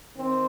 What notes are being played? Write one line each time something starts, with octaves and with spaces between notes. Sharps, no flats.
D#3 C4